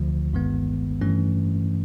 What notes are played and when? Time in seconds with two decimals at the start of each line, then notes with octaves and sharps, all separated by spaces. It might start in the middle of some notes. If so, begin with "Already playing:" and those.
Already playing: D2 D3 F3
0.33 G1 G2 D#3 G#3 B3
1.01 G2 E3 A3 C#4